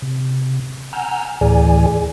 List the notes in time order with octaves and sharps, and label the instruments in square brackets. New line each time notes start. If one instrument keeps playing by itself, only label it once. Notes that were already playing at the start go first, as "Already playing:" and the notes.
[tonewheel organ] C3
F#5 G#5 A#5 E6 F6 G6
D2 A2 E3 G#4 D5 G#5